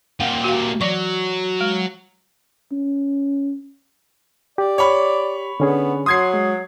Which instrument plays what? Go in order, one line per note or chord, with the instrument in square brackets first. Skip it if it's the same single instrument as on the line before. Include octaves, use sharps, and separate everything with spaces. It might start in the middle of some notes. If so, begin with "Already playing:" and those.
[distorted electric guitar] A#2 G4 [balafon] F5 F#5
[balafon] F#4 F5
[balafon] E3 D5 C#6 [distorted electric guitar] F#3
[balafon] G#3
[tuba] C#4
[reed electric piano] G4 [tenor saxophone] D5
[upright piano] C#5 B5
[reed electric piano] D3 C#4 G#4 [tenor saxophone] B3
[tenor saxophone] F#3 [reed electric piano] C6 [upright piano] D#6 G#6 C7
[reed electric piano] G#3